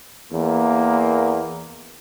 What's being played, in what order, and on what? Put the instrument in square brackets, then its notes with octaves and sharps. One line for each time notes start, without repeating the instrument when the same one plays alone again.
[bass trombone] E2 [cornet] A#3